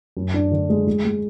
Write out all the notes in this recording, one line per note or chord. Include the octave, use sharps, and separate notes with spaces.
F#2
D4
D3
G#3
G#3
G#3